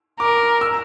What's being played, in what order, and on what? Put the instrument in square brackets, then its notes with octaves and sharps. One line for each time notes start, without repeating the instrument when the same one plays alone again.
[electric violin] A#4 [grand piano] D6
[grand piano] E6